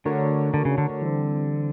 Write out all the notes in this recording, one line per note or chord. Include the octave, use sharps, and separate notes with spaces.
D3 A3 D4 F#4 A#4 C#5
D3
C#3
D3
D3
E3 G3 C4